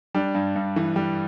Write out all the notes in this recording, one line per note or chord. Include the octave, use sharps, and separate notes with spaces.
G3 D4
G2
G2
E3
G3